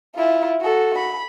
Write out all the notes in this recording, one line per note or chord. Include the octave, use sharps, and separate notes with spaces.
E4 F4
F#4 A4
B5